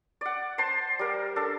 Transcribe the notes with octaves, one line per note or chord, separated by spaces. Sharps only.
D5 F#5
C5 A5 C6
G3 A#4
D4 A4